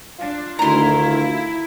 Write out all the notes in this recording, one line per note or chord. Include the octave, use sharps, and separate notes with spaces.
D4 F4
D2 D#3 E4 A#5 C6